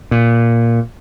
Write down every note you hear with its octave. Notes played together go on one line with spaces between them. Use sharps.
A#2